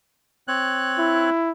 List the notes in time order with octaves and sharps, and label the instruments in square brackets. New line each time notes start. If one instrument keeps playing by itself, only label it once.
[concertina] C4 C#5 F#6
[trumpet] E4